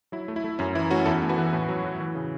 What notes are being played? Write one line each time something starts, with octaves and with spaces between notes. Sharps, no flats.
F#3 E4
A3
E4
A3
F#2 C#4
E3 E4
A3 C#4 F#4
E2 E4 A4
A3
F#4 B4
E3
A2
F#3
A2
E3
C#3